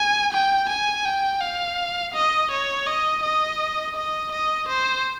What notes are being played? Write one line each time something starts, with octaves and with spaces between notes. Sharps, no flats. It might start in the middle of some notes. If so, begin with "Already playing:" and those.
Already playing: G#5
G5
G#5
G5
F5
D#5
C#5
D#5
D#5
D#5
D#5
C5